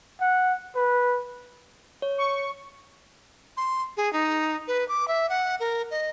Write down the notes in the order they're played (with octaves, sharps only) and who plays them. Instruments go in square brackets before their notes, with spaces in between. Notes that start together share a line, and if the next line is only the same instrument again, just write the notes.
[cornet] F#5
B4
[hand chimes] C#5
[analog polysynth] C#6
[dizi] C6
G#4
D#4
B4
D6
E5
F#5
A#4
D#5